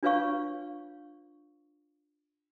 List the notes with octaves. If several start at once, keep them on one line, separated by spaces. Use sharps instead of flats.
D4 F4 B4 C#5 F5 C#6